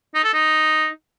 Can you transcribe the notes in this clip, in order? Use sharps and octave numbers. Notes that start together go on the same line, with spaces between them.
D#4
A4
D#4